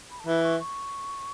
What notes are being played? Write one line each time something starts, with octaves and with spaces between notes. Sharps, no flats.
B5
A5
E3 B5
C#6
C#6